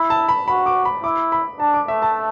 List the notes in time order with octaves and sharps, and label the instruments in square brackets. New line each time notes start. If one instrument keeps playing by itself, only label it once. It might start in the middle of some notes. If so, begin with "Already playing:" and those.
Already playing: [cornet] E4 [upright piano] B5
[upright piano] A5
B5
[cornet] F#4 [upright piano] B5
[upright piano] D6
B5
[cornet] E4 [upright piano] D6
[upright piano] B5
[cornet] D4 [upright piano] A5
[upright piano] D6
[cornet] A3 [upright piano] E5
[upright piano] A5